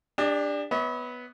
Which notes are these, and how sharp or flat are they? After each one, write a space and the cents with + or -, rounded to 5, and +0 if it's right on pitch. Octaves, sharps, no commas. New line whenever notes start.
D4 +0 G4 +40 D#5 -35
B3 +0 C#5 +10 E5 -45